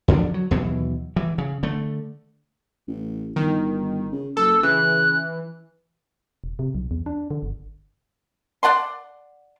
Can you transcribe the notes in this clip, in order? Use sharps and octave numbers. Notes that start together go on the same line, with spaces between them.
F2 D3 F3 D4
F#3
D#2 B2 E3 F#3
E3
C#3
D3 A3
A1
G1 D#3
C#3
F#1 A4 E6
C#3 E3 F#6
E1
C3
B1
E2
D4
D3
G1
D5 F#5 A5 C6